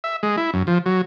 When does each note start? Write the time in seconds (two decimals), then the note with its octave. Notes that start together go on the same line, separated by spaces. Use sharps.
0.04 E5
0.23 G#3
0.37 E4
0.54 F#2
0.67 F3
0.86 F#3